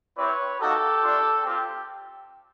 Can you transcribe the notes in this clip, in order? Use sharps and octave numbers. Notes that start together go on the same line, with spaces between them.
C4 E4 G4 B4 C#5
A#3 D#4 F#4 G4 A4
A3 D4 F4
C4 F4 G4